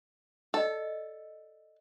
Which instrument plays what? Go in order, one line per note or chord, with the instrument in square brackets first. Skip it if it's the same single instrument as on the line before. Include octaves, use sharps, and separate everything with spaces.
[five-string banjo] A4 [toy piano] D5 D#5